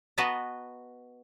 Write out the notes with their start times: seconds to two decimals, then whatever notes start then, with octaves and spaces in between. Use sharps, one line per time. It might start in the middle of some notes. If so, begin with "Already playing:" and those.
0.18 B3 F#4 B4 D#5 A5 A#5